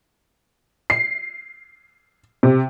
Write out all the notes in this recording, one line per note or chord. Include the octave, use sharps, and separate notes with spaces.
C7
C3